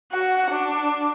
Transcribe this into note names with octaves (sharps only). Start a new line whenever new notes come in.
F#4 F#5
D4